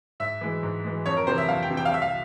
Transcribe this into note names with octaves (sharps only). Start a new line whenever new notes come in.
G#2 E5
E3 G#3
G#2
E3 G#3
F2 C#5
A#4
C3 E3 C5
E5
F2 F5
G5
C3 E3
G5
F5
C2 E5
F5